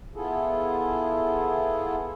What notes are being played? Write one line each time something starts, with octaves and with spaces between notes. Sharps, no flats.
B3 E4 F4 G#4 A4